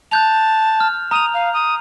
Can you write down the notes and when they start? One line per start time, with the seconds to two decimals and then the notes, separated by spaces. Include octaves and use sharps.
0.11 A5 F#6 G6 F7
0.80 F6
1.11 A#5 D#6 F7
1.34 F5
1.54 D#6